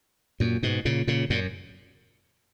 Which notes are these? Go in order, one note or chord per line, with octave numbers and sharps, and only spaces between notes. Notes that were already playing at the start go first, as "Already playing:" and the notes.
F#2 A#2
G#2 B2
A#2 C#3
A#2 C#3
F#2 A#2